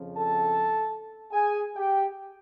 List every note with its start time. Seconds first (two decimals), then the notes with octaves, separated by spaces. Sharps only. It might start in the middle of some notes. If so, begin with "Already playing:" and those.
Already playing: F2 C#3 F3
0.16 A4 A5
1.32 G#4 G#5
1.76 G4 G5